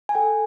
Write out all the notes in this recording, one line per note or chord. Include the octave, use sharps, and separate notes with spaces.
G#5
A4 G5